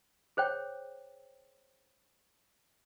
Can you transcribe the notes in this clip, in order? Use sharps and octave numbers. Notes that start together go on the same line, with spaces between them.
G#4 C5 C#5 G5